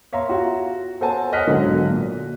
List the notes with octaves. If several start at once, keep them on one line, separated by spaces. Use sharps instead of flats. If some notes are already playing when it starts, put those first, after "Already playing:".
C#5 E5 F5 A#5 C6
F4 F#4
A4 C5 C#5 F#5 G#5 A5
C#5 D#5 F#5 F6 F#6 B6
B1 G#2 D3 F#3
A#2